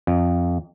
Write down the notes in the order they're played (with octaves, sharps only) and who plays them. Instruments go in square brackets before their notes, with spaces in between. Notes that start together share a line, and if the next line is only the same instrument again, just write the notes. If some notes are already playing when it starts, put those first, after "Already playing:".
[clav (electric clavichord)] F2